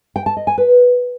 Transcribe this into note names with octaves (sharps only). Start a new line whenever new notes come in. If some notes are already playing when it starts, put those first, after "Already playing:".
G5
A5
D#5
G#5
B4